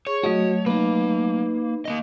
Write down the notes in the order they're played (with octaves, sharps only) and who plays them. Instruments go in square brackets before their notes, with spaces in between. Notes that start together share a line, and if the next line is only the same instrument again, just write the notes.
[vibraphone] G#4 C#6 [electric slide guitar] C#5
[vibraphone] F#3 A3 [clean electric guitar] F#4 D#5
[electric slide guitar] A#3 [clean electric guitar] D#4 B4
[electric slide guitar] A#3 B3 D#5